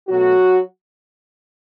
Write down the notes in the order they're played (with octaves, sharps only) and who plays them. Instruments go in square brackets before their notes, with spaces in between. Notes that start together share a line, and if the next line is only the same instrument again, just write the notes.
[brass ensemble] B2 F#3 A3 F#4